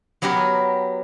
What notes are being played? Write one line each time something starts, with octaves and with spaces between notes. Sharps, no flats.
F#3 B3 G4 A#4 B4